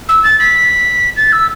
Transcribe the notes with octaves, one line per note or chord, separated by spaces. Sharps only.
E6
A6
B6
A6
E6